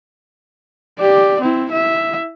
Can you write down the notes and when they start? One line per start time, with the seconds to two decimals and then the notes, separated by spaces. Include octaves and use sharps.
0.99 G4 D5
1.41 C4 E4
1.72 E4 E5